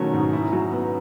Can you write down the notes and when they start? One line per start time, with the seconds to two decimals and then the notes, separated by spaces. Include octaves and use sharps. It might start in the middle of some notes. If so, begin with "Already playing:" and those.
Already playing: B2 D#3 F#3 A3 C#4
0.13 G#2
0.33 E4
0.53 F#3
0.72 B3